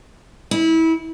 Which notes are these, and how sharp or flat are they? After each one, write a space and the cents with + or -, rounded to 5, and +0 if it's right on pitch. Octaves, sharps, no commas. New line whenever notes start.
E4 -25